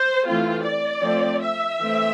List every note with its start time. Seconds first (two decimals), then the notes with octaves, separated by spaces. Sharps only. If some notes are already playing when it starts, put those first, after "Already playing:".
Already playing: C5
0.25 E3 A3 C4 F4
0.64 D5
1.02 F3 A3 C4
1.41 E5
1.78 E3 A3 C4